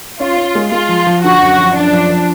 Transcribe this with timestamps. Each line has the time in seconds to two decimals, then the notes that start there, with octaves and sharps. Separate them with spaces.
0.20 C#4 F4
0.37 C#4
0.55 G#3
0.71 G#3 F4
0.89 F3
1.07 F3
1.24 D3 F#4
1.41 F#2
1.58 F3
1.75 F#2 D4
1.93 F3
2.10 F3